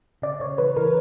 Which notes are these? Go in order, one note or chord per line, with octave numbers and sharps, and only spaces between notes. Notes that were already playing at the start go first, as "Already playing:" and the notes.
C#3 D5
C#3 C#5
E3 B4
E3 A#4